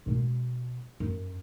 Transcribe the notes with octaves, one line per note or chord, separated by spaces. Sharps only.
B2 G#3
F#2